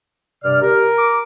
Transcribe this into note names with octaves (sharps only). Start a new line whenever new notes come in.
G2 C3 D5 F6
G4 A#4
D6